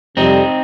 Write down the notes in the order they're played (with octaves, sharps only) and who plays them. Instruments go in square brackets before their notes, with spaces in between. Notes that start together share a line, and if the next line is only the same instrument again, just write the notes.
[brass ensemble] F2 C3 G3 [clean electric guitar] C4 D#4